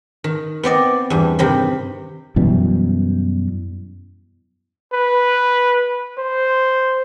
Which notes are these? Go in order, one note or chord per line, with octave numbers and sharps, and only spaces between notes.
D#3
B3 C4 D5 D#5
E2 G2
C3 D#3 C4 B5
F#2 B2 E3 G3
B4
C5